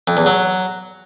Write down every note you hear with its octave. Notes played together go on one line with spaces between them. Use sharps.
F2
E2
F#3